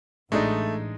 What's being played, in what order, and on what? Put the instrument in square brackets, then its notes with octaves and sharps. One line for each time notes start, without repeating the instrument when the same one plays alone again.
[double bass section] A1 [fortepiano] G#3 D4 D#4 [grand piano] A3